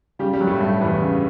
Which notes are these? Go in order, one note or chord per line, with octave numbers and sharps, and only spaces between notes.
C#3 G3 G4
G3 G4
F#3
A2 A3
G2 G3 A3
E2 B2 B3
C#3